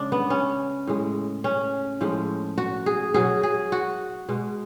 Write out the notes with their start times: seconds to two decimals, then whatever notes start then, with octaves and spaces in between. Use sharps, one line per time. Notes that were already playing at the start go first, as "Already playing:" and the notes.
Already playing: C#3 G#3 D4
0.12 B3
0.30 C#4
0.87 A2 G#3
1.44 C#4
2.01 A2 F3 G#3
2.58 F#4
2.86 G#4
3.14 B2 F#3 G#4
3.43 G#4
3.72 F#4
4.29 B2 G#3